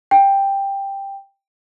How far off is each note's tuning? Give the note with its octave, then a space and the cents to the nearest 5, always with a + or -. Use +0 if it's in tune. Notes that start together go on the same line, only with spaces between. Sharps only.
G5 +10